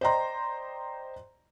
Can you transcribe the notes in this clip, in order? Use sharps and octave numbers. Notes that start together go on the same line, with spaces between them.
C5 D5 D#5 G5 A#5 C6